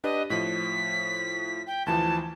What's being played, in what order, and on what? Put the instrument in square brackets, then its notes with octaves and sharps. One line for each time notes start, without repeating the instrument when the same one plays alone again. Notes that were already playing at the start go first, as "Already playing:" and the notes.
[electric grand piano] D4 G4 B4 [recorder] D#5
[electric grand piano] A2 F3 [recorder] B6
[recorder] G5
[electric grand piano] D2 E3 F3 [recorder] A5